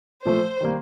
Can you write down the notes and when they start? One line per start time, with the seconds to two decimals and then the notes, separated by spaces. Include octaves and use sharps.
0.25 A#2 F3 A3 C5
0.61 D#3 G3 A#3